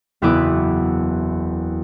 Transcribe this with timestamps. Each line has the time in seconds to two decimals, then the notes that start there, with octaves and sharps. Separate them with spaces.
0.22 F#1 E2 B3 E4 B4 D6